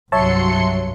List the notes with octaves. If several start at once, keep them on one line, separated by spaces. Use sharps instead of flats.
C2 G2 F#3 C#5 E5 A5 C6 C#7